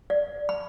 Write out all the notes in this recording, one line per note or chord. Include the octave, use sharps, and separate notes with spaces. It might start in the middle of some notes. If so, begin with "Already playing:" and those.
D5
B5